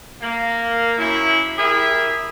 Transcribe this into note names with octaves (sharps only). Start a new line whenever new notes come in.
A#3
F#2 C#4 E4
E4 G4 G#4 A#4 E5